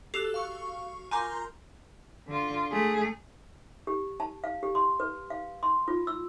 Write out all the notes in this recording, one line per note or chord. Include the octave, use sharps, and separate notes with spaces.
F#4 G4 A4 E6 F#6 C7 F7
F5 C#6
F4 A#4 G#5 A#5 C6 D6 G6
D3 F4
A3 G#4
G4
A5
F5
G4
C6
B4
F5
C6
F4
E6